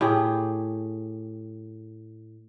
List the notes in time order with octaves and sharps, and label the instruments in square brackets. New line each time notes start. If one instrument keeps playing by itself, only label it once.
[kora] A2 G4 G#4